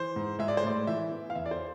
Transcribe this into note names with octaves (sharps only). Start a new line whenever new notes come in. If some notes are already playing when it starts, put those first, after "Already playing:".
Already playing: E3 C5
G#2
G#3 E5
D5
C5
A2 D5
E3 E5
B3
F5
E2 E5
D5
C5